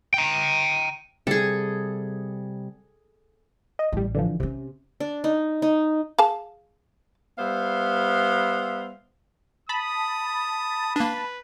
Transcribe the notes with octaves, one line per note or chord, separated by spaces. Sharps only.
G5 A#5
C3 G3 G#4 A4
D#5
A1 A2 G3
D3 E3 F3
C3 C#4 D4
D4
D#4
D#4
G#4 F5 A5
G3 B3 C5 E5 F5
A5 B5 D#6
A#3 D4 B4